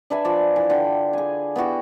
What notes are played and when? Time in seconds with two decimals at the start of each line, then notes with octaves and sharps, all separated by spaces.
0.10 D4 B4 E5 G#5
0.25 F3 D5
0.56 E3
0.70 D3 G5
1.13 G#4 G#5
1.56 B3 E4 F#4 G4